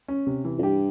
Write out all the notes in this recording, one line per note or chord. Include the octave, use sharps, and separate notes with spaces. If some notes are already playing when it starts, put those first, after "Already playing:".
C#4
C3
E3
F2
G2 G4